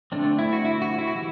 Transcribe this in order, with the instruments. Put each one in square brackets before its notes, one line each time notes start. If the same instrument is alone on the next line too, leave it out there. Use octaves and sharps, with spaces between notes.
[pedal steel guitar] D3 A3 C4 D4
E4
F#4
E4
F#4
E4
F#4
E3 G3 E4